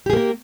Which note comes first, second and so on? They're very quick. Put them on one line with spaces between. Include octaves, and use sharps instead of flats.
G4 G#4 A#3 A#4